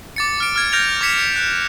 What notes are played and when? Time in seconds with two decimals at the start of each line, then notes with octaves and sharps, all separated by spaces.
0.16 D6 A6 C#7
0.38 D6 F6 D7
0.56 F6 G#6
0.73 F6 G6 A#6 D7 F7
1.01 D6 G#6 B6 C#7 E7
1.36 F#6